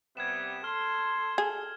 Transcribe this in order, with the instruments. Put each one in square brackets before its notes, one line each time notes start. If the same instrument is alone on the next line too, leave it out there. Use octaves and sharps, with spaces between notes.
[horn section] C3 G3 B3 [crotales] G#6 E7
[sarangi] A4 [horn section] C6 [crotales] F6
[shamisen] G#4